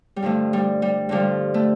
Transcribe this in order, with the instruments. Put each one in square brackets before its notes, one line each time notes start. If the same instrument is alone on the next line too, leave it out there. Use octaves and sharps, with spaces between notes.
[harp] G3
G2 D3 F3 A3
G3
G3
G2 D3 F3 G3
A3